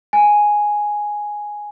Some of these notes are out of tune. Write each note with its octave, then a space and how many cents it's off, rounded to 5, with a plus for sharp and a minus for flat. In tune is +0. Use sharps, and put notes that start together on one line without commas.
G#5 +0